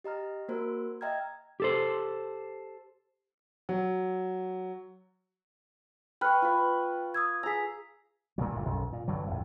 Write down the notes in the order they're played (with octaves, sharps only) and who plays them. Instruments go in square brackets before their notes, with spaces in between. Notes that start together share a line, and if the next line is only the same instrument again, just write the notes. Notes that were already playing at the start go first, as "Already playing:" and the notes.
[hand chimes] G4 D#5 A#5 F6
A#3 F#4 A#4 C5
D#5 E5 G5 A#5 F6 G#6
[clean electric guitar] G4 A4 C5
[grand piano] F#3
[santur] B4 C#6 [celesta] G5 F6 F#6
[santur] F4 B4
[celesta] D#6 E6 G#6
[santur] G#4 A#5 [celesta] E6 B6
[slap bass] G2 A#2 C#3 F#3
G1 G2 A#2
B1 F#2
A#2
G2 D3 F#3
A#1 F2 A2